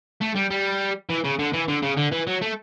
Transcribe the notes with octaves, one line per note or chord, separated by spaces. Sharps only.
A3
G3
G3
E3
C#3
D3
E3
D3
C#3
D3
E3
F#3
A3